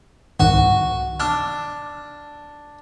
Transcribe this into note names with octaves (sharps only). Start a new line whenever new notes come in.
C2 G#2 D#3 F#4
D4 E6 F6